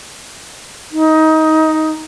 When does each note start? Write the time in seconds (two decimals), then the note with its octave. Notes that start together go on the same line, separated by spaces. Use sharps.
0.92 D#4